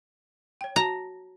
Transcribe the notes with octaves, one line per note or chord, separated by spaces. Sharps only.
C#5 G5
F#4 A5 A#5